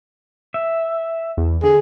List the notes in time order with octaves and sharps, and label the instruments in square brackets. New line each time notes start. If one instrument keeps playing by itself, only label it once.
[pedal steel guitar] E5
[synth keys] E2
[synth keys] D3 [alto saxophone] G#4